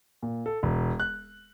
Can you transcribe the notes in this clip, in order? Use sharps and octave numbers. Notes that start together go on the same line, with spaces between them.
A#2
A4
E1
F#6